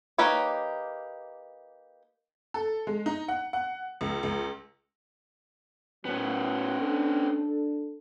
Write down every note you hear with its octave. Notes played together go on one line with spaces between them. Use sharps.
A#3 D#4 G4 B4 C#5
A4
G#3
D#4
F#5
F#5
C#2
C#2
A2 F#3 A#3 B3 C#4
D4 A4